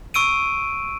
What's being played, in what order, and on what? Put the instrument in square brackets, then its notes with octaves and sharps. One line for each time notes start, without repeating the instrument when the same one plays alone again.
[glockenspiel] C#6 E6 D7 D#7